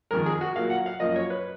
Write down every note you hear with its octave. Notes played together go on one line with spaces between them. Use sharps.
F2 D#3 G#3 A#4
G#4
F#4
A#2 F#3 A#3 F5
F#5
F5
F#2 F3 A#3 D#5
C#5
B4